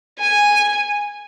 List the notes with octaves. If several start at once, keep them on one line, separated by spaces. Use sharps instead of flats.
G#5